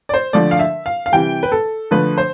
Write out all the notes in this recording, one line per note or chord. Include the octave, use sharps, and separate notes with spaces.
D5
C5
D3 F3 A3 D5
F5
E5
F5
F5
C3 E3 G3 G5
B4
A4
D3 F3 A3 B4
C5